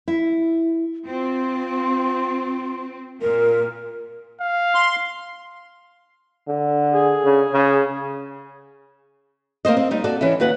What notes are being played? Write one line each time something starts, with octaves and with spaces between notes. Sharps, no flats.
E4
C4 F4
A#2 A#4
F5
C6
D3
G#4
C#3
C#3
A#3 C4 C5 D#5
C4
G3 D#4
F#4 A4 D5
E3 C#4 E4
D#2 F#4 B4 F#5